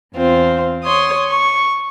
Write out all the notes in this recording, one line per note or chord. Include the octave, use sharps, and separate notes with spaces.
E2 C4 F4
C#5 C6 D#6
C#6